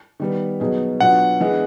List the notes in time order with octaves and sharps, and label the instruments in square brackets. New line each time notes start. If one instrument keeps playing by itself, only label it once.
[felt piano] D#3 G3 B3
B2 F#3 B3 D#4 G#4
[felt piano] B2 F#3 B3 D4 F4 [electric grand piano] F#5
[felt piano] E3 G#3 B3 D4